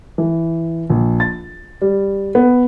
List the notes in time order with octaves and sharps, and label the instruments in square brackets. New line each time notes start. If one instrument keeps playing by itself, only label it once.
[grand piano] E3
A#1
A6
G3
B3